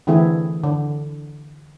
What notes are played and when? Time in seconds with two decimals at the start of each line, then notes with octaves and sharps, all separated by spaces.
0.07 D3 E3 A3 C4 E4 G#4
0.63 D3